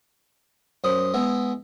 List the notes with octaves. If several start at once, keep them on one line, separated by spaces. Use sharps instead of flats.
F#2 C5 D#6
G#3 B3 E4